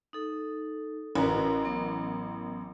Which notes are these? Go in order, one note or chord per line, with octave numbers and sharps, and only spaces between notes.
D#4 A4
A1 F#4 A#4 B4
F#3 B3 D6